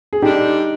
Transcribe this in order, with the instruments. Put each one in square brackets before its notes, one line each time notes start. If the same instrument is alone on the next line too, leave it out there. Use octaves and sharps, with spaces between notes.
[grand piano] G#4
[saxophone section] D3 G3 D4 [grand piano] D#4 G4